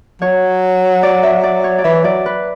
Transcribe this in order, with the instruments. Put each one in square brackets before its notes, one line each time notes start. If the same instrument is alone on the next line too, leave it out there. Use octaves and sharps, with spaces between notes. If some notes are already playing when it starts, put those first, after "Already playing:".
[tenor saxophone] F#3 [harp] C#5
[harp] D5
E5
D5
C#5
D5
[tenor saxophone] E3 [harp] E5
[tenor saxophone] F#3 [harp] D5
[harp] B4